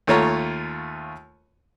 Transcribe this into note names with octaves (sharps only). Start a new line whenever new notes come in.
D#2 A3 F4 C#5 A#5